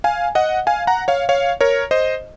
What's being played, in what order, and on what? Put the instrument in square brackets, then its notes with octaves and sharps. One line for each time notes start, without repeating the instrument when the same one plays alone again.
[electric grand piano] F5 G#5
D#5 F#5
F5 G#5
F#5 A#5
C#5 F5
C#5 F5
A#4 C#5
C5 D#5